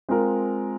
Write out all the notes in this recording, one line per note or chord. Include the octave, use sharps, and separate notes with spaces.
G#3 C4 F4 A#4